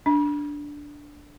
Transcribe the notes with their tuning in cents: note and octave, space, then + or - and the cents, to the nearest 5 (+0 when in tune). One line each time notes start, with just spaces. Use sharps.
D4 -5